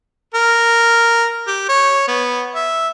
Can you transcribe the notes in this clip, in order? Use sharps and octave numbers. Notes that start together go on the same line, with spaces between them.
A#4
G4
C#5
B3
E5